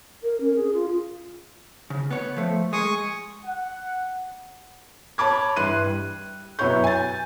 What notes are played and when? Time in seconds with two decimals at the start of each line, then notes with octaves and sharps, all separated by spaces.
0.23 A#4
0.40 C#4
0.56 G#4
0.73 F4
1.90 C#3
2.11 B3 C#5
2.36 F3 A3
2.73 G#3 G#5 C#6 D#6
3.44 F#5
5.18 C#5 A5 B5 D6 G#6
5.56 G2 E3 C6 F#6 D#7
5.86 G3
6.59 F#2 B2 E4 C#5 C#6 G6
6.84 G#5 A6